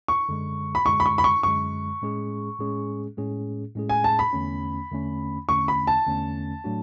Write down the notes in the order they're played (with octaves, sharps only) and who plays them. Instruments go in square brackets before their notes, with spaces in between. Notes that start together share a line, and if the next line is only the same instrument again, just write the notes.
[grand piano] C#6
[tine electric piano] F#2 D3 G#3
[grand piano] B5
[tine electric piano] F#2 D3 G#3 [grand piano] C#6
[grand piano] B5
C#6
B5
C#6
[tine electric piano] F#2 D3 G#3 [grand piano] C#6
[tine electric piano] A2 G#3 C#4 G#4
A2 G#3 C#4 G#4
A2 G#3 C#4 G#4
A2 G#3 C#4 G#4
[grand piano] G#5
A5
B5
[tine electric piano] E2 D3 A3 C#4
E2 D3 A3 C#4
[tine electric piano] E2 D3 A3 C#4 [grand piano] C#6
[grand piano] B5
A5
[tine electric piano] E2 D3 A3 C#4
A2 F#3 A3 D4 F#4